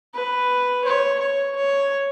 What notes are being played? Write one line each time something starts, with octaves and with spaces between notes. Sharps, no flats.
B4
C#5
C#5
C#5